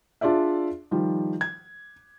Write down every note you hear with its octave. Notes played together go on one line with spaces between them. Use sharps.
D4 F4 G#4 D5 E5
D#3 F3 G3
G#6